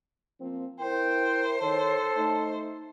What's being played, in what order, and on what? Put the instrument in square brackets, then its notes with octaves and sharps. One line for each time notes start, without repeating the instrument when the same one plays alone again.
[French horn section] F3 A#3 C4
[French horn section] E4 A#4 [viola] C5 [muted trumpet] G5
[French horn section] D#3 C#5 [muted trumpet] A4
[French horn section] A3 D#4